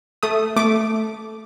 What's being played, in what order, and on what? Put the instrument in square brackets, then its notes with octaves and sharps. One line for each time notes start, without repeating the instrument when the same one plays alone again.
[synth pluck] A3 D#6
A3 D6